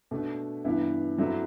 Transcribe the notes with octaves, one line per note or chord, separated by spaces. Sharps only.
B2 A3 D4
G2 E3 B3 E4
G2 F#3 A3 C4 E4